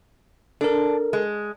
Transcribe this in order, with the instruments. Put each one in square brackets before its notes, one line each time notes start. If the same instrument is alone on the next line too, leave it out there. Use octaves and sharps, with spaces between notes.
[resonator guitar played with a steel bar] D4 [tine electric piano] A4 A#4
[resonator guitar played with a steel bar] G#3